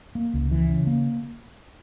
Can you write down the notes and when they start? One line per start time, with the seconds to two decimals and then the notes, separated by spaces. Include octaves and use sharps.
0.15 A#3
0.34 C#2
0.51 E3
0.69 C#3
0.87 A#3